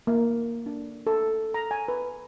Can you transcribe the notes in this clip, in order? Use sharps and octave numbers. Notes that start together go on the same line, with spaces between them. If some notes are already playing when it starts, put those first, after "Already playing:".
A#3
D4
A4
A#5
G#5
B4